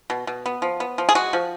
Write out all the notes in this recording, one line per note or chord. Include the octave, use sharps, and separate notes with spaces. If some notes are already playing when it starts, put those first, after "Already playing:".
B2
B2
B3
F3
B3
F3
G#4
G#3 F#4
F3